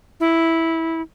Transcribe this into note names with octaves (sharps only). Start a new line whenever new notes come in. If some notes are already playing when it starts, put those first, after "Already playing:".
E4